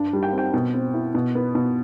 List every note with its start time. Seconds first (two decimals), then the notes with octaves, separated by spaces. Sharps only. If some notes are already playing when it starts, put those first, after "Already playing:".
Already playing: G2 D4
0.13 G3
0.23 G5
0.33 C4 G5
0.53 B2 G5
0.74 C4
0.94 E4
1.15 B2
1.35 B3
1.55 B2